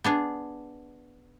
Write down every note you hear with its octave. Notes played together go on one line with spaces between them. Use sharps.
B3 D4 G#4